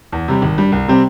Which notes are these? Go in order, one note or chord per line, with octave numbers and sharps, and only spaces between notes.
E2
C3 G3
G#1
G2 G3
C2
C3 G3 C4